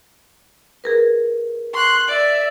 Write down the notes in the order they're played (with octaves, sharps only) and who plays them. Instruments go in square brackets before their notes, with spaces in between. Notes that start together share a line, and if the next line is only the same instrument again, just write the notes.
[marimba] G#4 A#4 B4
[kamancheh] C6 F#6 [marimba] C#6
[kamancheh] D5 E5